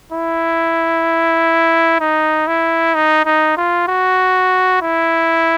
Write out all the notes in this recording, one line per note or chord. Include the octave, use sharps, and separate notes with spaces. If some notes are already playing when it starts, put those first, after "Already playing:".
E4
D#4
E4
D#4
D#4
F4
F#4
E4